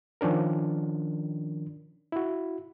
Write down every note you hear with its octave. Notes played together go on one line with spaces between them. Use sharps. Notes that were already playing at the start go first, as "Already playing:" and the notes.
D#3 F3 C#4 D4 A#4
E4 F#4